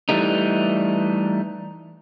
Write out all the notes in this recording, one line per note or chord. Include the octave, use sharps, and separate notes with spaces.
E3 G3 A3 D#4